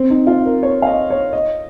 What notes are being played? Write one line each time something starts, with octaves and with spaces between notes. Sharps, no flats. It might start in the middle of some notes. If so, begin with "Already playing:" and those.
Already playing: C4
D#4
F4
A#4
C#5
F5
D#5
C#5
D#5